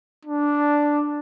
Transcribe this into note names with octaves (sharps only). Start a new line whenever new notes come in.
D4